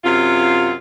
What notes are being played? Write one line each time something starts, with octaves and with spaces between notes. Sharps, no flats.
F#2 C3 F4